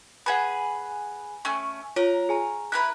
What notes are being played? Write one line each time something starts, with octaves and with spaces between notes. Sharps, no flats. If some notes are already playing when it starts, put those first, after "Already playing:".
G#4 B4 F#5 G#5 B5
A3 C#4 C#6
F4 A#4 C#5
G#4 G#5 A#5
E4 A#4 B4 F#6